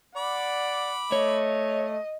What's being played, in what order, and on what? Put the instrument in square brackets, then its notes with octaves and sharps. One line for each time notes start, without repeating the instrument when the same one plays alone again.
[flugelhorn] D5 [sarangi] F#5 [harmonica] B5 D6
[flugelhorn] A3 [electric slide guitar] C#5 [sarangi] D#5